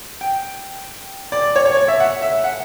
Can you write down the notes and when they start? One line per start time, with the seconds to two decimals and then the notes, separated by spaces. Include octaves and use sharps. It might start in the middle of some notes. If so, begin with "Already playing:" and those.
0.21 G5
1.32 D5
1.56 C#5
1.66 C#5
1.77 C#5
1.88 E5
2.00 F#5
2.22 E5
2.44 F#5